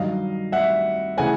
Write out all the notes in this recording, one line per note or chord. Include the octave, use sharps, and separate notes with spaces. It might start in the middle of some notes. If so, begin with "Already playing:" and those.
Already playing: G2 D#3 F#3 D#5 F5
E5 F#5
C#3 E3 A3 F#5 G#5